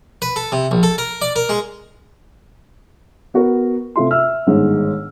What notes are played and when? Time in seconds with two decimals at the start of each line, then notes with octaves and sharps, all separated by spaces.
0.22 B4
0.36 A4
0.52 C3
0.71 A#1
0.83 A4
0.98 A#4
1.22 D5
1.36 A#4
1.49 G#3
3.34 B3 F#4 A#4
3.96 C3 A3 F4 E5 C6
4.11 E5 E6 F6
4.47 G1 G#2 D#3